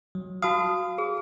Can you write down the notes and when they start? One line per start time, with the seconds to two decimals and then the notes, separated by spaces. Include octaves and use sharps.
0.15 F#3
0.42 F#4 F5 A5 D#6
0.98 G#4